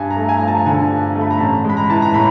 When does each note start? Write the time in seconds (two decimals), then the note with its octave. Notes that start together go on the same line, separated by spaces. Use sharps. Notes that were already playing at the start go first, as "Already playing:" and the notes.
Already playing: G2 G#5
0.11 A#5
0.16 A3
0.29 G#5
0.39 F3 A#5
0.48 A5
0.59 A5
0.66 D3 G#5
0.91 G2
1.15 A3
1.21 B5
1.31 A#5
1.40 A1 A5
1.64 G#3
1.70 B5
1.77 A#5
1.89 E3 A5
2.02 A#5
2.14 A2 B5